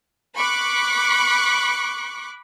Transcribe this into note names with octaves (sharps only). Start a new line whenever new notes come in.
B5 C#6 D6 F#6